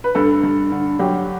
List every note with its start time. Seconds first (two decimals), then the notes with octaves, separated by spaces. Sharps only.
0.04 B4
0.15 G2 A4
0.43 G2
0.72 D3
0.99 F#3 G4